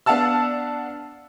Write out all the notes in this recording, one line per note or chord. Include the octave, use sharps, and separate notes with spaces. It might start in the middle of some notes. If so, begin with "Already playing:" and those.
B3 D4 F5 F#5 A5 E6